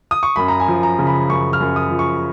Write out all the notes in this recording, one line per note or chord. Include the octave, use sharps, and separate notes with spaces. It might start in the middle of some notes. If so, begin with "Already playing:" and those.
D#6
C#6
F#2 B5
A#5
G#5
F3
A#5
C#3
B5
F#2 C#6
F6
F#2
D#6
F3
C#6